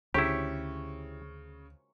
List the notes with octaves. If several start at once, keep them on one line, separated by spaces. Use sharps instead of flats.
D2 C#3 E4 G4 C#6